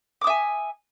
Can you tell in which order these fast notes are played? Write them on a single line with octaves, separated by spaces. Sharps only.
D6 D#6 E5 G#5